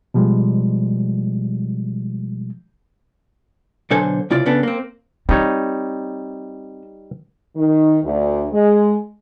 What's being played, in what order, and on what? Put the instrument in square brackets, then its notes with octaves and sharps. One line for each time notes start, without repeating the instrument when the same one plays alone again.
[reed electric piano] B2 F3 G3 G#3
[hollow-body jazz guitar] B1 D3 A4 C5 G#5
C#2 C3 E4 F4 D5
C#3 B3 D4 A4
A#3 C4
[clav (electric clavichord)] G3 D#4 C#5 [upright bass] C4
[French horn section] D#3
D2
G#3